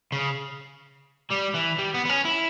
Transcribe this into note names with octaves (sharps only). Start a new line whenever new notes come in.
C#3
G3
E3
G3
B3
B3
C#4
E4